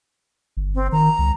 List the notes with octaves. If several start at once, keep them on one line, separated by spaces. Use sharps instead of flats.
G1
C4
D#3 A#5
C#2